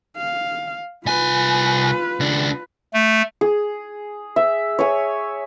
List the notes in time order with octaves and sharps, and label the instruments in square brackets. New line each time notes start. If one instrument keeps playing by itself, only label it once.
[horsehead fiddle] F5
[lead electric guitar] C2 G#5 [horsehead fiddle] F4 B4
[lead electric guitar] C#2 D4
[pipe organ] A3
[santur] G#4
E5
C#5 G#5